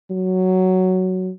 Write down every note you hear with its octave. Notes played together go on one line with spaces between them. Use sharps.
F#3